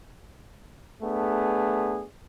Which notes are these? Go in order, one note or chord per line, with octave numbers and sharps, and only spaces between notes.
A3 B3 D4 G#4